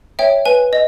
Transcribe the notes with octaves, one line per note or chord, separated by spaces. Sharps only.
C#5 E5 G5
B4 G#5
D#5